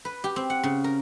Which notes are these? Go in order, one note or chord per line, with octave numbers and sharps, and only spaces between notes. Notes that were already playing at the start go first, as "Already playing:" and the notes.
B4
G4
C4
F#5
C#3
A#4